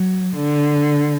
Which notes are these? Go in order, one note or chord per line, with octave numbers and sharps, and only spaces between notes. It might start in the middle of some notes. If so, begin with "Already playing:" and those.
Already playing: F#3
D3